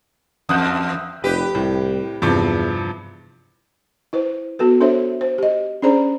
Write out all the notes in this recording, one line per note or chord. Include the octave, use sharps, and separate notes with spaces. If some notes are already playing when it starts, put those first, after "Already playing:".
E2 D#6 F#6 G6
F1 G4 B4
C2 A2
E2 G2 C3 F3
E4 B4 C5
B3 F#4 A4 B4
D4 A4 C5 C#5 E5
C5
G4 D#5
C#4 D4 G#4 C5 D5 A#5